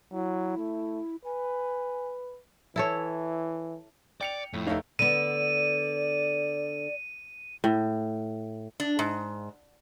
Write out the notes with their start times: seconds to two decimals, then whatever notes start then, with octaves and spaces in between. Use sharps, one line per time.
0.12 F#3 E4
0.57 A3
1.25 B4 G#5
2.76 E3 E4 A4 C#5
4.21 D5 G5 C#7 F7
4.53 F2 A2
4.67 F1 A3 D#4 C#5 F5
4.99 D3 B3 D5 D#7
7.64 A2
8.80 D4
8.99 G#2